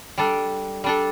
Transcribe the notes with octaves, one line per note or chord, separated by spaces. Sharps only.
G3 D4 A4
G3 D4 A4